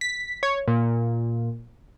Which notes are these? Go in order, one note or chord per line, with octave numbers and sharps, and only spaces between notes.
B6
C#5
A#2